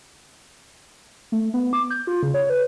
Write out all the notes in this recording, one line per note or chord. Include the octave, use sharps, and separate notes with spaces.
A3
B3
D6
G6
F4
C#3
C#5
B4